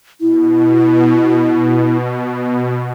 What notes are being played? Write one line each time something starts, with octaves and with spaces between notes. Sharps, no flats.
B2 E4